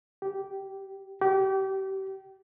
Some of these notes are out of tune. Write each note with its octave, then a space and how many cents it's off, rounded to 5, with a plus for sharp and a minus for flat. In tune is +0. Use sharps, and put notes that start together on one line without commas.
G4 -15
G4 -30